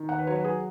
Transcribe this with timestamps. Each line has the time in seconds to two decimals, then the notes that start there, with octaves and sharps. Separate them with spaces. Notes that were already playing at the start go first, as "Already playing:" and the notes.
Already playing: D#3
0.09 D#2 F#5
0.19 B4
0.27 F#3 C#5
0.36 B4
0.44 F#3 G#4